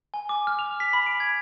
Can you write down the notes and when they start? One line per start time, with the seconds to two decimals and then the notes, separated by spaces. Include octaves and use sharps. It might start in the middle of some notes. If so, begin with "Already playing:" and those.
0.14 G#5
0.29 D6
0.47 F6
0.59 F7
0.80 B6
0.93 B5
1.06 D7
1.20 G#6